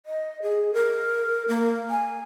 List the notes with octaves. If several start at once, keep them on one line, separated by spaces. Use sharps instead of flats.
D#5
G#4
A#4
A#3
G#5